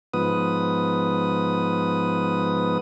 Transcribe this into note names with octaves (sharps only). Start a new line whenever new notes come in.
G#2 F3 B3 B4 D#6